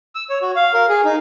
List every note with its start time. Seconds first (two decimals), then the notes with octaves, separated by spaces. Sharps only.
0.15 E6
0.30 C#5
0.42 F#4
0.56 F5
0.74 A#4
0.89 G#4
1.05 D#4